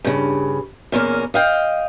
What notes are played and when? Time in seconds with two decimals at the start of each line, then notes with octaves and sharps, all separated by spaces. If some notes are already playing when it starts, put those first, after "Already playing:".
0.05 G2 C#3
0.92 E2 A#2 C#4 A#4
1.34 D#5 F5 G5